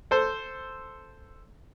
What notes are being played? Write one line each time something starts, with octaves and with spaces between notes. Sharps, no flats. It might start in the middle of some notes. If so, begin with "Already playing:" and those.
A4 C5